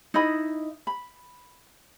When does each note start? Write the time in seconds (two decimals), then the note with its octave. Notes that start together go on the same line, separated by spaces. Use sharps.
0.14 D#4 E4 D#5 B5
0.87 B5